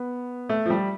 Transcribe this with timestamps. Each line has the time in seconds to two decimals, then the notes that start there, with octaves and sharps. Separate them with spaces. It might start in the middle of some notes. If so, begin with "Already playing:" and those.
Already playing: B3
0.49 A3
0.66 F3
0.70 G3